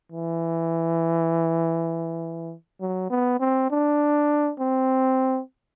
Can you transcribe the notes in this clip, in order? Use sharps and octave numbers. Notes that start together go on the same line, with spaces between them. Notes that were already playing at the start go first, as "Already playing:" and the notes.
E3
F#3
B3
C4
D4
C4